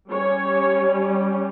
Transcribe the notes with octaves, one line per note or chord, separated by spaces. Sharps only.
G3 C#4 C#5